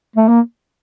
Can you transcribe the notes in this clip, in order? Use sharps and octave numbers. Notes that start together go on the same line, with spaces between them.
A3
A#3